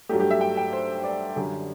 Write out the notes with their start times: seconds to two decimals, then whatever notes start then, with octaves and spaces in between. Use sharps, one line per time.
0.09 G2 F#3 A3 G4
0.20 G4
0.31 E5
0.41 G5
0.57 G5
0.73 C5
1.04 D5
1.36 F#2 D3 G3